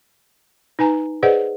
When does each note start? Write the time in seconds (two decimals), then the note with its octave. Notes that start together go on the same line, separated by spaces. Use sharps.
0.79 D#4 B4 G#5 A#5
1.23 G#4 B4 C5 D5 D#5 F#5